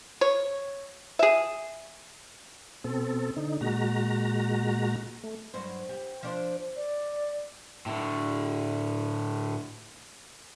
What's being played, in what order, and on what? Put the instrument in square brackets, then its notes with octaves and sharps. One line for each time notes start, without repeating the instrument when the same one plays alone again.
[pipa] C#5
G#4 E5
[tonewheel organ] B2 C4 A4
D3 D#4
A#2 G#3 F#4 A#5
A3
[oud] G2 F#3 C5
G4
F3 D4 C5
[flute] D5
[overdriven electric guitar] A2 D3